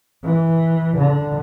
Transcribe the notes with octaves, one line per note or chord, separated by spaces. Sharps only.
E3
D3